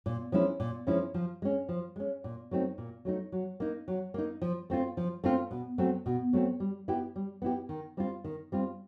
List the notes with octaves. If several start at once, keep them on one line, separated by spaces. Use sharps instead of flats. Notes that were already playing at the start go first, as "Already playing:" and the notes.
A#2
F3 G#3 C#4 E4
A#2
F3 G#3 C#4 E4
F3
G#3 C#4
F3
G#3 C#4
A#2
F#3 A3 C4 D#4
A#2
F#3 A3 C4 D#4
F#3
A#3 D#4
F#3
A#3 D#4
F3
A3 C4 F4
F3
A3 C4 F4
B2
F#3 A3 C4
B2
F#3 A3 C4
G3
B3 E4 G4
G3
B3 E4 G4
D#3
G3 C4 F4
D#3
G3 C4 F4